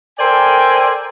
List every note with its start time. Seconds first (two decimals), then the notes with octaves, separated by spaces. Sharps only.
0.19 A4 A#4 C5 D5 G5 G#5